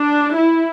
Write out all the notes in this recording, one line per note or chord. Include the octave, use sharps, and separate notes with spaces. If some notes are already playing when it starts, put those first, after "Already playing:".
Already playing: D4
E4